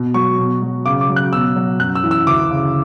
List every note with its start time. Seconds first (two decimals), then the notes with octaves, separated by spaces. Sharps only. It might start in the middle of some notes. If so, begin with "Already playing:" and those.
Already playing: B2
0.14 F#3 C#6
0.38 B2
0.62 F#3
0.85 C#3 D6
1.01 D6
1.09 F#3
1.16 F#6
1.33 B2 E6
1.56 F#3
1.80 F#2 F#6
1.95 E6
2.03 E3
2.11 E6
2.27 D2 D6
2.51 C#3